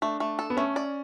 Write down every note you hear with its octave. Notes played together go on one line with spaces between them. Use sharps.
A3 D4
A3
A4
B3
A3 C#4
D5